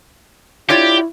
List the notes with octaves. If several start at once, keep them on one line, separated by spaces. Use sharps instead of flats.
E4 F4 G4 C#5 D5